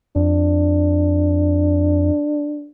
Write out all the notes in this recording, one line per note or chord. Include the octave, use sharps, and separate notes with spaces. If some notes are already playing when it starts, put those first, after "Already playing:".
F2 D4